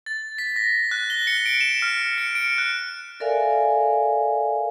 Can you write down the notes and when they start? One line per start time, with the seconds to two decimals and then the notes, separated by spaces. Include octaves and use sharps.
0.06 A6
0.38 B6
0.56 A#6
0.91 F#6
1.10 G7
1.27 C#7
1.46 D7
1.61 E7
1.82 F6
2.18 C#7
2.35 D7
2.58 F#6
3.20 A4 A#4 D5 E5 F5 G#5